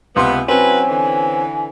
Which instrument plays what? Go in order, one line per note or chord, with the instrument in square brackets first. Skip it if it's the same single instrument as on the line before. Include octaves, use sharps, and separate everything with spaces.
[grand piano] C#2 C3 C6 [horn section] B3
[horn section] F#3 E4 B4 [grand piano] C4 C#4 [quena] G#5
[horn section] D3 E3